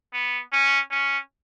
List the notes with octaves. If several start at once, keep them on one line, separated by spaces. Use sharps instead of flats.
B3
C#4
C#4